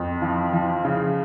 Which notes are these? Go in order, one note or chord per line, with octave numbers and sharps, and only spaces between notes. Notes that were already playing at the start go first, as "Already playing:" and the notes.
Already playing: F2
F3
F3
C#3